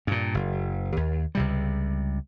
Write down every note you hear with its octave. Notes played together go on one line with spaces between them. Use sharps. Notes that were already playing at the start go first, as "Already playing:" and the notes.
G2 A#2
F#1
D#2
C#2 C3 G3